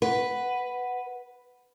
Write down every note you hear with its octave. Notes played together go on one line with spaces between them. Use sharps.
B4 F#5